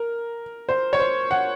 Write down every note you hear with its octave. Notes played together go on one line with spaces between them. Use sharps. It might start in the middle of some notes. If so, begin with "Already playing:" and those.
Already playing: A#4
C5
C#5
C5
F#5